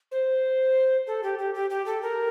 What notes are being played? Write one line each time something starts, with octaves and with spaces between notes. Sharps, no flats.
C5
A4
G4
G4
G4
G4
A4
A#4